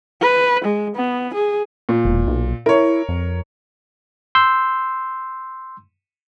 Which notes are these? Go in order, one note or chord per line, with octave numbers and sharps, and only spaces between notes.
B4
G#3
B3
G#4
A#2
E1
B1
E4 A#4 C#5
F2
C6 E6 G6